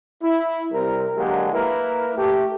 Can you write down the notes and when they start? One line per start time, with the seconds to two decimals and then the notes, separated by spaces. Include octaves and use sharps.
0.23 E4
0.72 C3 G3 C4 A#4
1.16 D3 F#3 G#3 A#3 F#4 G4
1.53 A#3 E4 A#4 B4
2.16 A3 G4